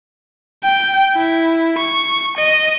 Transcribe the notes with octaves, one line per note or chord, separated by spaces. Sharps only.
G5
E4
C#6
D#5